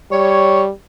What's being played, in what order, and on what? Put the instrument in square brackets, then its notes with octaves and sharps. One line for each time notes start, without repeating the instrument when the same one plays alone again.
[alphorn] G3 [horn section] C#5